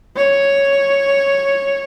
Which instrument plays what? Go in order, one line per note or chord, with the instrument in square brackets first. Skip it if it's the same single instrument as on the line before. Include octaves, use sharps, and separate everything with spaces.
[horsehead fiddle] C#5